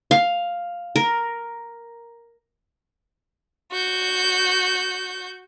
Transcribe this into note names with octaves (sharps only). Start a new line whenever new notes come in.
F5
A#4
F#4 G6